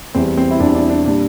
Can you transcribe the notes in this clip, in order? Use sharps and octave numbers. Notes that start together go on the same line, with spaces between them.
E2 E3 G3 C4
C4
E4
E2 E3 G3 D4
D4
D4
A#2 G3 D4